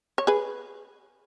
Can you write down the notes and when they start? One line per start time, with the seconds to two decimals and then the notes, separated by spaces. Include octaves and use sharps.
0.18 C#5
0.27 G#4 B4